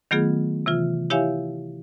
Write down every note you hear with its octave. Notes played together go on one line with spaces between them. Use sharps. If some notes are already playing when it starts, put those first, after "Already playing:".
D#3 F#3 A3 B3 F4 G#4
C3 E3 F4
E4 G4 C#5 E5 F5 G#5